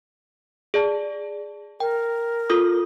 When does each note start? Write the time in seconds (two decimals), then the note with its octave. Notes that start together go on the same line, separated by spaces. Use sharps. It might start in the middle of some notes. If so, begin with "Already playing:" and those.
0.74 G#4 D5 A5
1.80 A#4 G5
2.50 F4 A4 D#6